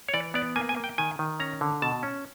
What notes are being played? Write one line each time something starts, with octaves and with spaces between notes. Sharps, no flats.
C#5
E3 D5
B3 D5
A#3 G#5
G#5
A#3
G5
D#3 G#5
D#3
C#4 A#5
D3
B2 A5
C#4